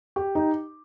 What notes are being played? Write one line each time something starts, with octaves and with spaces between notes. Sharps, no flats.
G4
D#4